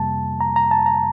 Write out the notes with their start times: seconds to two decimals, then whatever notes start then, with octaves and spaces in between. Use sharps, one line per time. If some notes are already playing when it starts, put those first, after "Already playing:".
Already playing: F2 C3 G3 A#3 A5
0.41 A#5
0.56 A#5
0.71 A5
0.86 A#5